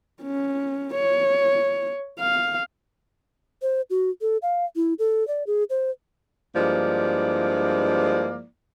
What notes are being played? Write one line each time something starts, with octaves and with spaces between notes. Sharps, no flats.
C#4
C#5
F5
C5
F#4
A4
F5
E4
A4
D5
G#4
C5
G2 F3 G#3 A#3 E4 D5